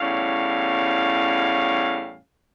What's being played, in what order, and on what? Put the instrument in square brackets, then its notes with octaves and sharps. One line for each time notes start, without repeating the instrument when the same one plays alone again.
[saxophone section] E2 A2 G3 C#4 F5